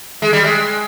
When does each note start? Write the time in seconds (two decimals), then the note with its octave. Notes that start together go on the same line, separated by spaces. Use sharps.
0.22 G#3
0.33 G3
0.44 G#3